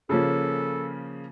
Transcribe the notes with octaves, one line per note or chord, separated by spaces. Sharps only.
C#3 F3 A#3 C#4 A4